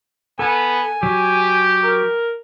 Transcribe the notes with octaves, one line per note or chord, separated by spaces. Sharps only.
B3 A4 G#5
F#3 G4
A#4